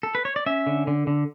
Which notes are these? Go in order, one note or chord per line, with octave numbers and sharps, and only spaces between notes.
A4
B4
C#5
D5
C#4 E5
D3
D3
D3